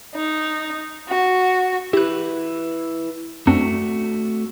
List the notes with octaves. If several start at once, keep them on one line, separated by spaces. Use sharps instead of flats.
D#4
F#4
E4 G4 B4 F#6
F#2 A3 C4 D4 F#4